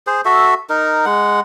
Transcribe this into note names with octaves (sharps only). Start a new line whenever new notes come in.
G#4 C5
F#4 A4 E5
D#4 A#4
G#3 F#5